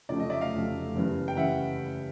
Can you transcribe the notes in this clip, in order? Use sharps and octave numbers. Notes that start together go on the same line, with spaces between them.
F1 F2 C#3 F#3 A3 D5
D#5
D5 E5
D#5 F5
F1 F2 C#3 F#3 A3
F#1 E2 C#3 E3 G3
G5
C#3 E3 G3 E5 F#5